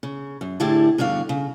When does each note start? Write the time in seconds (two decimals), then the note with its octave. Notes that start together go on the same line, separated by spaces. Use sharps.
0.03 C#3
0.41 F#2
0.60 A2 D3 E4 G4 G#4 A5
0.98 E2 G2 D3 F#4 F5
1.29 C#3